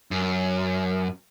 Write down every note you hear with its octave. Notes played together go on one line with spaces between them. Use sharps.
F#2